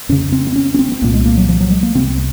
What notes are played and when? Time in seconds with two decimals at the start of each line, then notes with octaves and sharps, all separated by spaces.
0.09 F2 C#3 C#4
0.32 C4
0.47 C4
0.56 C#4
0.74 C#4
0.79 C4
0.92 C4
1.02 C2 A#2 A#3
1.14 G#3
1.26 A#3
1.37 F#3
1.49 F3
1.61 F#3
1.71 G#3
1.83 A#3
1.95 C2 C3 C4